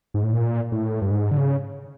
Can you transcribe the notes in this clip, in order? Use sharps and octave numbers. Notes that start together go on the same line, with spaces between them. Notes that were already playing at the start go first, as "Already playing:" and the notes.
G#2
A2
A#2
A2
G2
G#2
D3
C#3